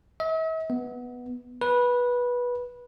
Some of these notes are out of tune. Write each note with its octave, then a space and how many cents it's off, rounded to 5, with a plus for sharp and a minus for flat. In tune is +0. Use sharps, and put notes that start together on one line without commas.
E5 -45
B3 -5
B4 -15